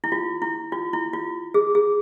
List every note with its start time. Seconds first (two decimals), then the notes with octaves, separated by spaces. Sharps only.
0.04 E4
0.12 F4
0.42 E4
0.72 F4
0.93 E4
1.13 F4
1.54 G#4
1.75 G#4